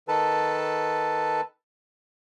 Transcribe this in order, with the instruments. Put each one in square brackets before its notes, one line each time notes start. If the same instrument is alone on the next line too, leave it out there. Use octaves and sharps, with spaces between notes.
[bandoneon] D#3 A4 B4 A5